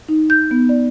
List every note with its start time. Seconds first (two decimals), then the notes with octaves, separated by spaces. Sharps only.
0.09 D#4
0.30 G6
0.51 B3
0.69 D5